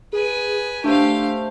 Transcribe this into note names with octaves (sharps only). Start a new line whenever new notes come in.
G#4 B4 G#5
A3 D4 G4 C5 F5